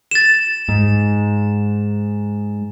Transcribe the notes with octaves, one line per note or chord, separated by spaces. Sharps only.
A6 E7
G#2